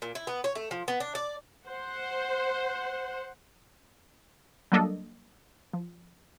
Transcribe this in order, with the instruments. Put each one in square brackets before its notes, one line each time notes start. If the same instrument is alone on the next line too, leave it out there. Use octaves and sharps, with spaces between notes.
[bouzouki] A#2
E4
B3
C#5
A3
F3
B3
D4
D5
[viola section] C5 F#5
[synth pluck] F#3 G3 A#3 D4 A4 D#5
F3